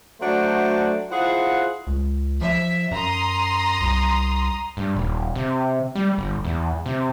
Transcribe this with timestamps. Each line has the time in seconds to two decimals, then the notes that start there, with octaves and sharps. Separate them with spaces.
0.20 F#3 A3 D4 F#4 C5
1.10 E4 F4 G#4 C5 F#5
1.87 C#2
2.41 F3 E5
2.91 F#2 A#5 C6 D#6
3.81 C2
4.77 G2
4.96 D#1
5.35 C3
5.95 G3
6.18 G1
6.45 E2
6.86 C3